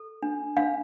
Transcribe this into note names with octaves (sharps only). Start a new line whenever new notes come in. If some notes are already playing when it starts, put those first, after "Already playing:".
Already playing: A4
D4
D4 F5